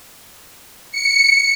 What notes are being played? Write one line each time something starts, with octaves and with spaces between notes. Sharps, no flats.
C#7